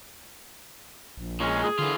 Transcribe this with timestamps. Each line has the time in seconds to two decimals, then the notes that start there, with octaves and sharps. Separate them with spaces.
1.17 A#1
1.40 A#2 G#3 C#4
1.64 G#4
1.79 D3 E3 F4